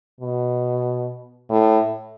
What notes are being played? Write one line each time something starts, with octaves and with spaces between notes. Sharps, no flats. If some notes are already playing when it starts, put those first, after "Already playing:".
B2
A2